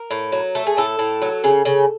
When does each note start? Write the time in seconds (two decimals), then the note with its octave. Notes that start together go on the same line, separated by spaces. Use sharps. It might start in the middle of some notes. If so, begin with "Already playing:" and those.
Already playing: A#4
0.11 A2
0.32 F#3
0.55 A3 A4
0.67 G#4
0.77 A2 A4
0.99 A2
1.22 F#3
1.44 C#3
1.65 C#3